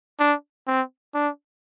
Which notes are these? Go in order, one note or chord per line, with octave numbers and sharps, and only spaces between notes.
D4
C4
D4